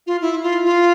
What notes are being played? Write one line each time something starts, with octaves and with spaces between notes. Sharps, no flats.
F4
E4
F4
F4